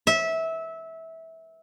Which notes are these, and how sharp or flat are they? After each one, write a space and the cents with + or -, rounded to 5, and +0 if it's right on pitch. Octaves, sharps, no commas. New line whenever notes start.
E5 -20